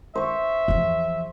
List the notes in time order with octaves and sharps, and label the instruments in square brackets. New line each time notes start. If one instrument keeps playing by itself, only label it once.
[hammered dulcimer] C5 C#6 [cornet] E5
[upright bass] E2 F3